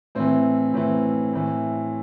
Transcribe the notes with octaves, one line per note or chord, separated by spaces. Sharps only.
A2 E3 C4
A2 E3 C4
A2 E3